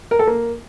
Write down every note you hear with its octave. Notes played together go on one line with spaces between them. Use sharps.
A#4
A4
A#3